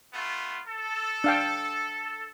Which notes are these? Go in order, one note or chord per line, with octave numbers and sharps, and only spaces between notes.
A3 B3 F4
A4
D4 F5 G5